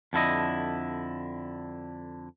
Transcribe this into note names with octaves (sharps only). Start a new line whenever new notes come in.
F2 D3 E4 D#5